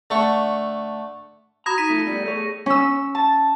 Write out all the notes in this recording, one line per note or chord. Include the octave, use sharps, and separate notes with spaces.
D3 A3 C#6
F#4 A#5 B5 D#6 G#6 A#6
D#4 B6 D#7
F2 A3
E2 G3 A3 D5
A3 G#4 C#5
C#4 E6
A5